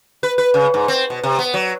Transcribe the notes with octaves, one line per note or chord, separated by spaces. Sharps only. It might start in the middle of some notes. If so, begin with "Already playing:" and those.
B4
B4
C#3
G#2
C4
B2
C3
B3
F#3